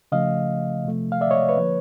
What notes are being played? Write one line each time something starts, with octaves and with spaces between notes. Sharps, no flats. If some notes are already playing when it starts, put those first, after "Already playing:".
C#3 F3 A3 D#5 F5
C3 F3 A3
F5
D5 E5
C#5 D#5
B4 C#5
D3 F3 A#3